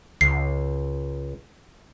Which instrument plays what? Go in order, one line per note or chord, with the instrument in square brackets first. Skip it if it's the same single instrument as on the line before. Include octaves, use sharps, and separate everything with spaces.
[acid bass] C#2 [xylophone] C7